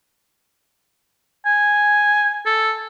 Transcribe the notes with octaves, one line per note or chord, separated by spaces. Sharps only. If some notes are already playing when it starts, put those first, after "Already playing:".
G#5
A4